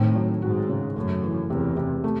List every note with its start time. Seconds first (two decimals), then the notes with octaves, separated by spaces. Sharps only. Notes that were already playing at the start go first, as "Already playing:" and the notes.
Already playing: A2 D#3 C4
0.15 F#3
0.42 G#2 F#4
0.69 C#3
0.96 F#2 A3
1.23 E3
1.49 E2 C3
1.77 C3
2.04 A3